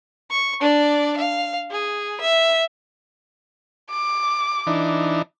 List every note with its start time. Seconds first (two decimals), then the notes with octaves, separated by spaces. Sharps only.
0.30 C#6
0.61 D4 D5
1.17 F5
1.71 G#4
2.21 E5
3.90 D6
4.67 E3 D4 D#4